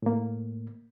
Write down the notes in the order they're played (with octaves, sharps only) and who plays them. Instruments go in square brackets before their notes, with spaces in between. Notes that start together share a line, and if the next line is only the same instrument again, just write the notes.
[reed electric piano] A2 A#3